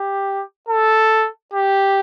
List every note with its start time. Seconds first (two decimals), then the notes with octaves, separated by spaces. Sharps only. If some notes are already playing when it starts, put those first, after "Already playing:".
Already playing: G4
0.69 A4
1.54 G4